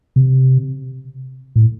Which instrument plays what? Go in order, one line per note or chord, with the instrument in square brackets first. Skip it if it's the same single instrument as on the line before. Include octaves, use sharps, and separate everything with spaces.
[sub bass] C3
A2